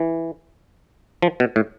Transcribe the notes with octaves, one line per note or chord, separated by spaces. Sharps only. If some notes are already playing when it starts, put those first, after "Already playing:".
Already playing: E3
F3
B2
A2